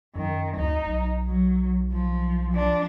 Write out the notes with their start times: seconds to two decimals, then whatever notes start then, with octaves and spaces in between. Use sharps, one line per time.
0.16 F#2 D#3
0.57 D2 D#4
0.86 B1
1.27 F#3
1.92 F3
2.52 F3 D4